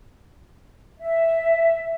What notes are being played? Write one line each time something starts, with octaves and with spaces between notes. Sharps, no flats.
E5